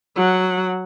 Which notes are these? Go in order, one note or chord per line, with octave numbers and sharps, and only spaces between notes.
F#3 F#5